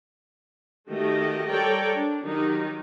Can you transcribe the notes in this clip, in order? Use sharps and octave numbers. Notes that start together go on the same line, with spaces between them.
D#3 A3 F#4 G4 D#5
G3 A4 A#4 C#5 D5 G5
D4
D#3 F#3 D#4 G4